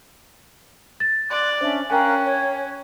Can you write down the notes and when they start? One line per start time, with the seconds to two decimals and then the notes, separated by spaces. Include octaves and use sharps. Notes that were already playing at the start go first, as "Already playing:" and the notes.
1.00 A6
1.30 D5 C6 D6 F#6
1.61 C#4 D4 C5 E5
1.90 C#4 A#4 F5 G5 G#5 F#6
2.24 C#5